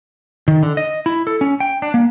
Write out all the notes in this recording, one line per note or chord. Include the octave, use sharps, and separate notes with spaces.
D#3
D3
D#5
E4
A4
C#4
G5
D4
A#3